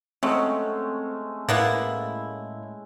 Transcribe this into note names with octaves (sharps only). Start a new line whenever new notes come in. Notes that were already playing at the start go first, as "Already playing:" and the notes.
F#3 G#3 A3 C4 C#4
A2 A#3 B3 E4